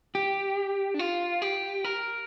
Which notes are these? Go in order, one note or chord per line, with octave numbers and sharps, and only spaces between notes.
G4
D4
F4
G4
A#4